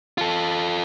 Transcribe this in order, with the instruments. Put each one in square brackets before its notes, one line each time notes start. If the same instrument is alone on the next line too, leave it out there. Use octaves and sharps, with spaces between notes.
[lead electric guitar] F4 A4